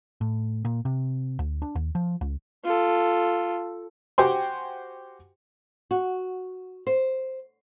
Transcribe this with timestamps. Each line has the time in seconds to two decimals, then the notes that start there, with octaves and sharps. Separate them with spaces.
0.21 A2
0.65 A#2
0.85 C3
1.39 D2
1.62 D4
1.75 D#2
1.95 F3
2.21 C#2
2.64 F4 A4
4.18 F#4 G4 C5 G5 G#5 C6
5.91 F#4
6.87 C5